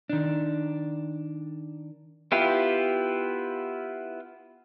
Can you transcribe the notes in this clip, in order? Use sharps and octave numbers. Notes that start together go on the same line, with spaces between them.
D#3 D4
B3 E4 F4 G4 F5